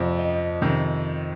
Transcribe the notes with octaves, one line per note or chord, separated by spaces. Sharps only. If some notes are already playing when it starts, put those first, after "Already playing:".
Already playing: F2 C3 F3 C4 D5
D#5
F2 C3 D#3